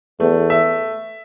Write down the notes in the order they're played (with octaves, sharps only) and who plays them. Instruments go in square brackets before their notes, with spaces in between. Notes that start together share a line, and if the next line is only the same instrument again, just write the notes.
[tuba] E2 [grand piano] A3
[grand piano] E5